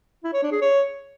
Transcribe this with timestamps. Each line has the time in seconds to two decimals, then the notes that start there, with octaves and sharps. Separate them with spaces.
0.24 E4
0.33 C#5
0.43 D4
0.52 G#4
0.61 C#5